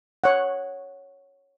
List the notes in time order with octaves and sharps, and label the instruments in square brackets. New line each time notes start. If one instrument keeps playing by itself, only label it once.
[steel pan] C#5 F#5